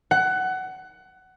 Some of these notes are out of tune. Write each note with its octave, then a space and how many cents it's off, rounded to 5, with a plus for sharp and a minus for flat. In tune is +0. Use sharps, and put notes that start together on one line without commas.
F#5 +20